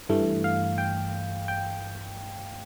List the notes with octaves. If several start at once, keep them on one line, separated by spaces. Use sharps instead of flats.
G2 E3 A3
F5
G5
G5